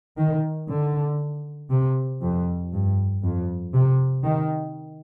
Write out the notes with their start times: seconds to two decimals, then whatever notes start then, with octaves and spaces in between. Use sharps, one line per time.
0.17 D#3
0.69 D3
1.70 C3
2.21 F2
2.73 G2
3.23 F2
3.74 C3
4.24 D#3